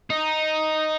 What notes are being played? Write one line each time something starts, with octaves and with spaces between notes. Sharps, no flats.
D#4